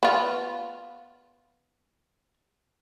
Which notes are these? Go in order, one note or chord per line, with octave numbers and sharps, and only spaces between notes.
B3 F4